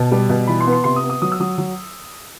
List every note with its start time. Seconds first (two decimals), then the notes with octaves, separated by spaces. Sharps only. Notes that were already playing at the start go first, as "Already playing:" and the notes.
Already playing: B2 A5
0.11 G3
0.29 B2
0.47 E3 B5
0.60 C6
0.67 B3
0.73 C6
0.84 C3 C6
0.96 D#6
1.03 B3
1.10 D#6
1.22 F#3 D#6
1.32 E6
1.40 F#3 D#6
1.58 F#3